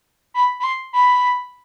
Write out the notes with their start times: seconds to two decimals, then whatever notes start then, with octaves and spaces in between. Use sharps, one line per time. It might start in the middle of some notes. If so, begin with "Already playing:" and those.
0.34 B5
0.60 B5
0.64 C6
0.93 B5